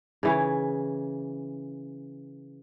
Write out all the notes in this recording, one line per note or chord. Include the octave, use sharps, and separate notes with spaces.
C#3 E3 C#5